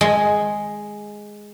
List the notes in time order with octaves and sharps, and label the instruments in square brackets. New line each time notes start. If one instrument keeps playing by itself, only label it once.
[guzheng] G#3